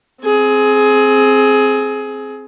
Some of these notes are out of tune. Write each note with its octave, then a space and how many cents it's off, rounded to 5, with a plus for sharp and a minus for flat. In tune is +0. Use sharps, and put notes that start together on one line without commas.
C4 +5 G#4 +20